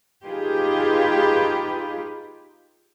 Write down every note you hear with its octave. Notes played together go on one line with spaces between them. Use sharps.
D#4 F4 G4 G#4 B4